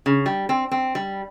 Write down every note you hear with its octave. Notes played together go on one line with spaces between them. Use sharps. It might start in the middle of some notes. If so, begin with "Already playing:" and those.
C#3
G3
C4
C4
G3